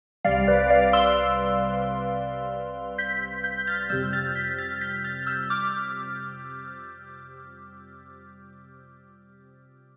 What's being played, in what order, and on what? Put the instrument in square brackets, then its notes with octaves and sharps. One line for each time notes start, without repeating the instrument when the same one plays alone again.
[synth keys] C2 C3 G3 D5 F5
B4 D5
D5 F5
C6 E6
G6 B6
G6 B6
G6
F6 A6
F2 C3 G3 E6 G6
F6 A6
G6 B6
F6 A6
G6 B6
F6 A6
E6 G6
D6 F6